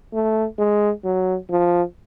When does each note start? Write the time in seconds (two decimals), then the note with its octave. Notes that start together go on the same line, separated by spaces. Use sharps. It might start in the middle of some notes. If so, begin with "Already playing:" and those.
0.14 A3
0.59 G#3
1.04 F#3
1.50 F3